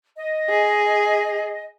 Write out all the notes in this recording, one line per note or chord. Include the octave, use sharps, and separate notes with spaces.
D#5
G#4